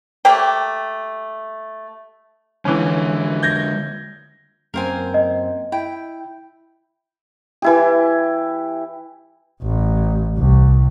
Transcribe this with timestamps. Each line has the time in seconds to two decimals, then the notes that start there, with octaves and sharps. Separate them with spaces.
0.25 A3 A#3 G4 G5
2.65 D3 E3 G#3 C#4
3.43 G6 G#6 A#6
4.74 F#2 A#3 C4 A#4 C5 G#5
5.14 D#5
5.72 E4 G5
7.62 E3 E4 G4
9.63 A1
10.37 C2